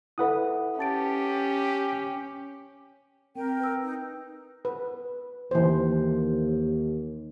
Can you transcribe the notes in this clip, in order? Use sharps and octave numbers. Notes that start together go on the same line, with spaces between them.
E4 A4 B4 E5 F#5 D#6
C#4 G4 A5 A6 D7
C4 A#4 G5
B4 E6
D#4
B4
D#2 E3 C5